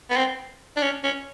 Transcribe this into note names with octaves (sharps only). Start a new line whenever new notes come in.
B3
C4
D4
C#4
C#4